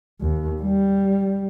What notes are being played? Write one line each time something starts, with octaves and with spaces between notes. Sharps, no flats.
D#2
G3